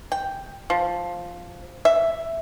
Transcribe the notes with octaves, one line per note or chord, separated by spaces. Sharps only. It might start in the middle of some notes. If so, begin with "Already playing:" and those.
G5
F3
E5